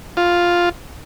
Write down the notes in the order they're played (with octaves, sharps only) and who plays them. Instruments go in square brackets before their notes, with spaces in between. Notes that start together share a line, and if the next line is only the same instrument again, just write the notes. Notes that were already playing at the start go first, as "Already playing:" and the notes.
[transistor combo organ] F4